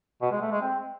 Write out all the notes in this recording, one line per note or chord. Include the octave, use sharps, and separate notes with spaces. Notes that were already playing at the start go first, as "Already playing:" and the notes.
B2
G#3
A3
G#3
C4